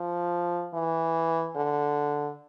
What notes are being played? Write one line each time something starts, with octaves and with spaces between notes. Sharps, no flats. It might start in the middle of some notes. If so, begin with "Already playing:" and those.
Already playing: F3
E3
D3